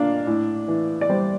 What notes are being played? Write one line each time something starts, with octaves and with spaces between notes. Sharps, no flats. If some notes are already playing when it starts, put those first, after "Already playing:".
Already playing: A#2 A#3 D4 D5 F5
A2
E3
D5
G3 C5